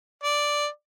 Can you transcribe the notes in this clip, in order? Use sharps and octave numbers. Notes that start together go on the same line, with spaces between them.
D5